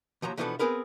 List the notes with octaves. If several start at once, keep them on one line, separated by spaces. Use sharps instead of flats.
D#2 F3 F#3 A#5
B2 E3 F3 B3 D4 A4
B3 C4 G#4 A#4 B4